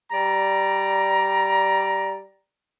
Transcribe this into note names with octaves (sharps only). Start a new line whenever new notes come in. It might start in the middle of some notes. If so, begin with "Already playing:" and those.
G3 D5 A#5